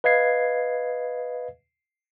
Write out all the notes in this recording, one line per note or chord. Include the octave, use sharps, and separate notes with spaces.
B4 D#5 F5 G#6 C7